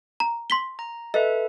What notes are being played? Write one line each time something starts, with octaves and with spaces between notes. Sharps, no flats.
A#5
C6 B6 G7
A#5
A4 B4 D#5 E5